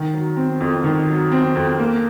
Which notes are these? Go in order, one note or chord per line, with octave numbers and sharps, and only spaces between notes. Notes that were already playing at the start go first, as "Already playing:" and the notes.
Already playing: D#3
F#3
C4
F2
D#3
F#3
C4
F2
A#3